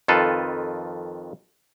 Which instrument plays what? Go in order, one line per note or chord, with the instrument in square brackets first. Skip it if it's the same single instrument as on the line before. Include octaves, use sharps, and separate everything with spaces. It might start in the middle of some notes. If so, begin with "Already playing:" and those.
[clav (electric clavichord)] F2 D#3 F4 A4 B4